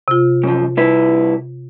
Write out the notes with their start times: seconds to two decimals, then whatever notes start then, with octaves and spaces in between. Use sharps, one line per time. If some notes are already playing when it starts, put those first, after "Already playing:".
0.08 C3 F4
0.43 F#2 F3
0.77 C2 E4 B4